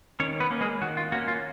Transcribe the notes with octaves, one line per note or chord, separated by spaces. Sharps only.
D#3 C#4 C#5
B3 B4
A#3 C#4
G#3 G#4
D#3 F#4
F4
A#3 C#4 F#4
F4